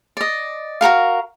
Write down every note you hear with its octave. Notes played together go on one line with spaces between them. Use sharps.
D5 D#5
F#4 A4 A#4 F5